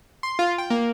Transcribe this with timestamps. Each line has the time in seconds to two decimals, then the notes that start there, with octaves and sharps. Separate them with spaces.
0.23 C6
0.39 F4
0.58 G5
0.70 A#3